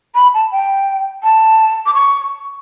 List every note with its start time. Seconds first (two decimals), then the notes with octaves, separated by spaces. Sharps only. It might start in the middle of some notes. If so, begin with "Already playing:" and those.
0.15 B5
0.34 A5
0.52 G5
1.23 A5
1.86 D6
1.94 C#6